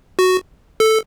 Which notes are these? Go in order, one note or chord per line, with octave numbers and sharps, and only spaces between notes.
F#4
A4